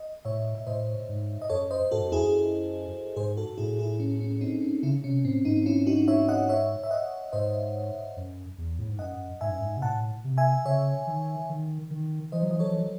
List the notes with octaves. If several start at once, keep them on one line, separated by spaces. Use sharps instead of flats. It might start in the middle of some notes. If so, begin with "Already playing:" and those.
Already playing: D#5
A2 C#5 E5
E5
A2 C5 D#5
G#2
D#5
F#2 A4 C#5
C5 D#5
G#2 F#4 A4
F#2
E2 E4 G#4
F#2
G#2 G#4 C5
F#4 A4
A2 E4 G#4
E4 G#4
C#4
C#4
C4 D#4
C#4
C#3 C#4 E4
C3 C#4
A2 C4
G#2 C4 D#4
C#4 E4
D#4 F#4
C#5 E5
D#5 F#5
C#5 E5
E5
D#5 F#5
G#2 C5 D#5
F#2
E2
A2
G#2
F#2 D#5 F#5
G#2 E5 G#5
F#2
G#2
C3
A2 F#5 A5
C3
E5 G#5
C#3 C#5 E5
D#3
D#3
D#3
E3 C5 D#5
F#3
E3 D#5
F#3 A4 C#5
E3
F#3